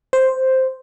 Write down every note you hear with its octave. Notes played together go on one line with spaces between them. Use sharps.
C5